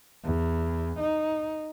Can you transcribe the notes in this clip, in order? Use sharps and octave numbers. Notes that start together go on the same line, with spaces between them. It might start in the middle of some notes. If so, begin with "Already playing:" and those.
E2
D#4